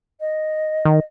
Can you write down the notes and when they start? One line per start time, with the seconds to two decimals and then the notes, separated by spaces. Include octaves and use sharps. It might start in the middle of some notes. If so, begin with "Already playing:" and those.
0.20 D#5
0.85 D#3